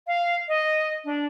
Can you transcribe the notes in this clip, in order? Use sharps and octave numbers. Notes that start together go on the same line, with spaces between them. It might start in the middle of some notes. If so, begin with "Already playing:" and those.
F5
D#5
D4